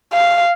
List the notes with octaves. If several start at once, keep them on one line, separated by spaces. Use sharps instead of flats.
F5